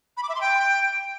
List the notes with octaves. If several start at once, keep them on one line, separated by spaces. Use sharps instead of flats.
B5
D6
E5
C6
G5